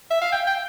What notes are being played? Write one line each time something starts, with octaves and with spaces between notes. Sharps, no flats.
E5
F5
G5
G5